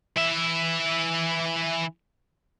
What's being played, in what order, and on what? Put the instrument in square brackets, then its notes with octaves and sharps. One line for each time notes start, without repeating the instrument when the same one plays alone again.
[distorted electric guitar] E3 E5